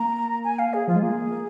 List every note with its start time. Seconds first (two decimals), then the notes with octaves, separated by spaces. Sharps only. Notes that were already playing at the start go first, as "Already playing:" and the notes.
Already playing: A#3 A#5
0.44 G#5
0.59 F5
0.74 G#4
0.88 F3 F4
0.96 G#3
1.02 A#3 G#4
1.32 A#3